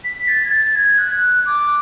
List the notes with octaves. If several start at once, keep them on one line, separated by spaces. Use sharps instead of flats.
B6
A6
G#6
A6
G#6
F#6
D6